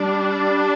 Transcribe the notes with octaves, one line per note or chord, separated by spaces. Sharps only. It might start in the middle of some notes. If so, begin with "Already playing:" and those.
Already playing: G3 D4